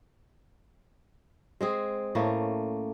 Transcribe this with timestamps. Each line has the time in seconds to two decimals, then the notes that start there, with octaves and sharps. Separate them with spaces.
1.61 G#3 C4 G#4
2.15 A2 A3 A#3 C#4